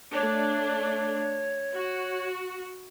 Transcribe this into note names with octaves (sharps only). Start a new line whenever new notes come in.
A3 D4 C#5
F#4